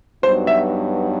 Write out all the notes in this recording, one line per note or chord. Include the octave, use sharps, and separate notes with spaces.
G2 F#3 B3 D#4 F#4 C5
E5